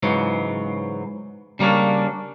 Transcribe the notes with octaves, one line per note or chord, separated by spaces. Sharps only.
G#2 C#3 E3 F#3
C#3 G3 A#3 C#4 D4